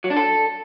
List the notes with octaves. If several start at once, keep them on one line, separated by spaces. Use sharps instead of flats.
F#3
D4
A4